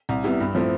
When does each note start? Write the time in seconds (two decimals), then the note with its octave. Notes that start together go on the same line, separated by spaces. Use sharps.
0.09 C2
0.24 C3 G3 B3 E4
0.40 G2
0.55 F3 A3 C4 E4